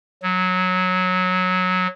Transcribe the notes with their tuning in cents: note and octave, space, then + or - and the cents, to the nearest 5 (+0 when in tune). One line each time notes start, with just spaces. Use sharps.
F#3 -10